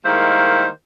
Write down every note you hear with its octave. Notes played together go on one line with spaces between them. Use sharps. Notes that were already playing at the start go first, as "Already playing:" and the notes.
D#3 G3 G#3 A#3 E4 C5